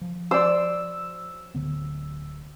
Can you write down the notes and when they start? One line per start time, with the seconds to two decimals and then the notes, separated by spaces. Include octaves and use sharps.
0.01 F3
0.31 C5 D5 E6
1.55 D1 D3 B3